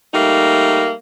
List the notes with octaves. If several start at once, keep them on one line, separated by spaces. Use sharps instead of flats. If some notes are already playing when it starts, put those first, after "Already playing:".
G3 A3 A#3 D#4